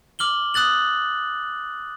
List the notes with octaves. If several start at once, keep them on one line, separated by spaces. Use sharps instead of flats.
D6 F6 F#7 G7
D#6 F#6 A6 F#7